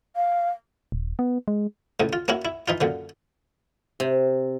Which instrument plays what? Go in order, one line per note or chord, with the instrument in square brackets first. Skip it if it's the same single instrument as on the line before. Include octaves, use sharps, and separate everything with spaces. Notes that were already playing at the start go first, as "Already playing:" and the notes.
[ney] F5
[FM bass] D#1
B3
G#3
[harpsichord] C#2 A2
F4
A#3 C#4 E4 F#4
E4
E3 D#4 F4
F#2 A#2 D3
[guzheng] C3